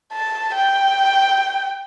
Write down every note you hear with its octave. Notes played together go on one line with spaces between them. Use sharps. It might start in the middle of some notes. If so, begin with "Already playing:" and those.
A5
G5